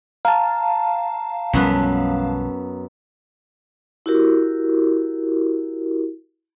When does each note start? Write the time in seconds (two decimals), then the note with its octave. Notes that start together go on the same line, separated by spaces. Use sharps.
0.25 F5 A5 A#5
1.53 B1 F#2 F3 G3 B3 B4
4.06 E4 F#4 G4 A#4